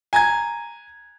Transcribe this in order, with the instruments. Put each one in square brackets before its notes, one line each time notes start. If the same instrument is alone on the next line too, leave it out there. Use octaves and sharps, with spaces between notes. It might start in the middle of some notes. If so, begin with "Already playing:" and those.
[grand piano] G#5 A#5 G#6